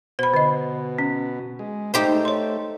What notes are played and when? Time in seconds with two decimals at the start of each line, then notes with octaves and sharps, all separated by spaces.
0.19 B2 C5 B5
0.34 D3 D#5
0.99 C#4
1.59 G#3
1.94 A3 D#4 G4 C5
2.25 C#5 C6